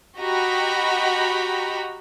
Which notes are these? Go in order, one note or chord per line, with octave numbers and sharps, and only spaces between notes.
F#4 G4 D#5 A#5 B5